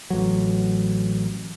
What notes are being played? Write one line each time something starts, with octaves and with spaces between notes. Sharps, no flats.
A1 F#3